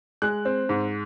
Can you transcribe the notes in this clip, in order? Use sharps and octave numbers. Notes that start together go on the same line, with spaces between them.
G#3 F#6
C4
G#2